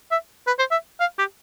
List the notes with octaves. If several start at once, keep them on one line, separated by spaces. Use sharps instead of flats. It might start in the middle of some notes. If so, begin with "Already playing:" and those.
E5
B4
C5
E5
F5
G4